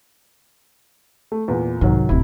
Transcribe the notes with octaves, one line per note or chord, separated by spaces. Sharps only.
A3
E2 A#2
C2 G#2 D#3 F#3
D1 A#1 C3 E4